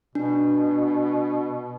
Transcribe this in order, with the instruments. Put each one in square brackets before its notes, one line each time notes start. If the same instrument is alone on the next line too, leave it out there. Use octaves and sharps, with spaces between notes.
[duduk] B2 [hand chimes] D4